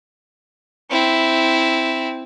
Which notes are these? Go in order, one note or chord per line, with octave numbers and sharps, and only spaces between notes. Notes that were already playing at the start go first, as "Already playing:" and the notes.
C4 E4